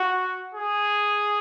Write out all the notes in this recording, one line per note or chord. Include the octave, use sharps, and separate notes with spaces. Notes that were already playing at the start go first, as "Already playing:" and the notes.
Already playing: F#4
G#4